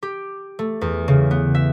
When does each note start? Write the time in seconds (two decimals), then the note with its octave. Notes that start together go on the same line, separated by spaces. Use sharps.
0.03 G4
0.59 A3
0.81 E2
1.08 C#3
1.31 B3
1.55 E5